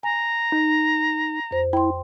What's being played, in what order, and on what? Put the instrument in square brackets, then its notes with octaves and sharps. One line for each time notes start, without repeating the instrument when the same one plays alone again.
[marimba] G#5 [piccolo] A#5
[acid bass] D#4
[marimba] F2 C5
[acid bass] E4 [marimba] G5 C6